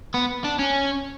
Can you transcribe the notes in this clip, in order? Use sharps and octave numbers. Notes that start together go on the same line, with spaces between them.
B3
D4
C#4